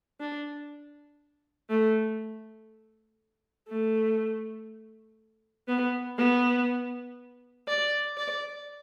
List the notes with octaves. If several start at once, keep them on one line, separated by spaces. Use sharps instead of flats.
D4
A3
A3
B3
B3
D5
D5